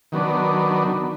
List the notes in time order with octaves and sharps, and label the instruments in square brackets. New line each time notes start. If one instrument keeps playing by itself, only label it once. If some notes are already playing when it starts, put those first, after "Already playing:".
[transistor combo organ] D#3 F#3 B3 D4